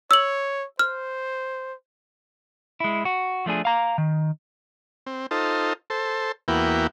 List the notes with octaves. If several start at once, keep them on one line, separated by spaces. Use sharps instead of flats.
C#5 E6 F#7
C5 F6
G#3 E4
F#4
F3 A3 D4 G#4
F5 A#5
D#3
C4
D#4 F4 A4 C5
A4 C5
E2 A#3 B3 E4 F#4 G5